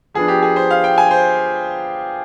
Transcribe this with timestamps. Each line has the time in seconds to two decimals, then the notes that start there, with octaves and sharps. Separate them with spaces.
0.14 F3 B3 D4 G#4
0.28 G4
0.43 G#4
0.56 C5
0.70 F5
0.84 G5
0.98 G#5
1.11 C5